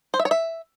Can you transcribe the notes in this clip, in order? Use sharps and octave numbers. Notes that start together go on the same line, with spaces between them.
C5
E5
C#5
E5